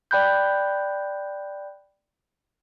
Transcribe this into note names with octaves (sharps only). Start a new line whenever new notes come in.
D5 G5 B5 F#6 G6